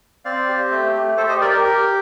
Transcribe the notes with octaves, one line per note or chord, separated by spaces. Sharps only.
C4 D5 F5
G4
A3
A3
G4 A4 C5
C5 D#5
G4 A#4 D5
A#4
G4